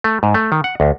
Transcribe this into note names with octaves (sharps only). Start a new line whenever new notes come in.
A3
G#2
A3
D#3
F#5
D2